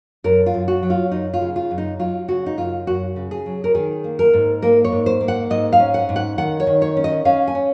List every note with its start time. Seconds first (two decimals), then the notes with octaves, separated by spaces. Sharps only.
0.24 F#2 A#4
0.46 F4
0.54 F#2
0.68 F#4
0.83 F#3
0.90 F4
1.11 F#2 D#4
1.34 F4
1.41 C#3
1.56 F4
1.71 F#2
1.78 D#4
1.99 F#3 F4
2.28 C#3 F#4
2.46 D#4
2.57 F#2 F4
2.87 F#2 F#4
3.16 C#3
3.31 G#4
3.46 F#3
3.64 A#4
3.75 D#3 G#4
4.04 A#3
4.19 A#4
4.33 G#2
4.62 A#3 A#4
4.85 C#5
4.92 G#2
5.06 C5
5.21 A#3
5.28 F#5
5.50 G#2 D#5
5.73 F5
5.80 C#4
5.94 F#5
6.09 G#2
6.16 F#5
6.38 D#3 F#5
6.60 C#5
6.67 D#3
6.82 C#5
6.97 C#4
7.04 D#5
7.25 C#4 F5
7.47 G#5
7.55 C#4